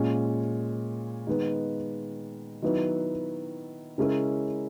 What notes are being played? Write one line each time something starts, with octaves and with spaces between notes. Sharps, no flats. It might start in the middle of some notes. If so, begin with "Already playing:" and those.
Already playing: A#2 G#3 C#4
D#3 G#3 B3
D#3 F#3 B3 E4 B4
C#3 G#3 C#4 E4 A#4